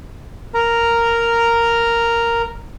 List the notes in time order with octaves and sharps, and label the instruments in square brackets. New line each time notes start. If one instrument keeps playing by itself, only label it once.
[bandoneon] A#4 A#5